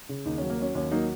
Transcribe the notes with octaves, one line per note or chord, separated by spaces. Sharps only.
C#3
D#2 D#4
F#3 C#4
A#3
F#3 C#4
D#2 C#4
F#3 A#3 D#4